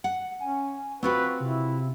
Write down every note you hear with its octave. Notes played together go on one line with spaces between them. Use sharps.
F#5
C#4 G#5
C4 F4 F#4 B4 C#6
C3 E4